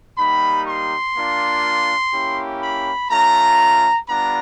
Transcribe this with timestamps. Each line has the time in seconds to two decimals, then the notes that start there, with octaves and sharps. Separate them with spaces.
0.18 G3 A#3 D#4 G4 B5
0.67 C6
1.15 A#3 D4 F4
2.13 A#3 C#4 E4 G4
2.62 B5
3.11 A3 C#4 F4 A#5
4.09 G3 B3 D4 F4 A#5